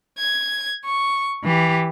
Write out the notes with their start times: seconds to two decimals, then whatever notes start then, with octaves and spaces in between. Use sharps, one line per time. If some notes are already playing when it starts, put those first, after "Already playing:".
0.17 G#6
0.85 C#6
1.43 E3 G4